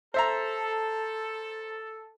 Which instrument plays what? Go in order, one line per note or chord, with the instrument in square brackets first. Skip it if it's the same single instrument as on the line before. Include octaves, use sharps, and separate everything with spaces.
[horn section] A4 [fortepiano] C5 E5 A#5